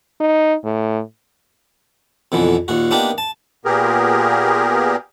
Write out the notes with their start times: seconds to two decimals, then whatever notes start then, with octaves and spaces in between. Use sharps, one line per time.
0.20 D#4
0.64 A2
2.32 F2 B2 D3 E3
2.68 D#2 A#2 F#4
2.91 A#3 B3 D4 D#4 G4
3.18 A5
3.65 A#2 B3 G4 G#4 A#4